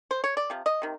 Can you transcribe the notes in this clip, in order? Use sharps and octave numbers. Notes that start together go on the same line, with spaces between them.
C5
C#5
D5
C3 F3
D#5
C3 D#3